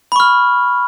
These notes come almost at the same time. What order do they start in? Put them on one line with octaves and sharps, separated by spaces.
B5 C#6 F6